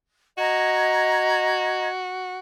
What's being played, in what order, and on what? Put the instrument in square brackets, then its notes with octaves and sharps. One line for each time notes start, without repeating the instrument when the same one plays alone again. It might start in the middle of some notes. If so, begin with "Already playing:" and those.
[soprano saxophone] F#4 [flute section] D#5 A#5 G#6